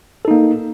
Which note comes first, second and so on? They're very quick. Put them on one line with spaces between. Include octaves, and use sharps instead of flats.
A4 D#4 A#3